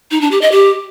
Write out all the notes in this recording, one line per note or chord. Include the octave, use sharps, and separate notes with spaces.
D#4
D4
G4
D#5
G4